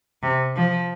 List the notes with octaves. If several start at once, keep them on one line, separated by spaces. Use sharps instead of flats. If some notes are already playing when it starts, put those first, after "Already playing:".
C3
F3